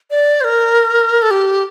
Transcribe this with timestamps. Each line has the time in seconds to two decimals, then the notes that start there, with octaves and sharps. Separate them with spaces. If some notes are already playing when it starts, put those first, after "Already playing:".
0.11 D5
0.41 C5
0.44 A#4
1.22 A4
1.31 G4